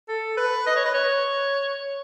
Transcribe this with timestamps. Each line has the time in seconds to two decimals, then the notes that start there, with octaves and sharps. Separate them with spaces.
0.08 A4
0.37 B4
0.66 D#5
0.76 C#5
0.85 B4
0.94 C#5